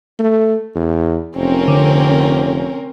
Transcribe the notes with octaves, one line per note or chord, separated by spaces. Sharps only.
A3
E2
F1 C4 C#4 A#4
D3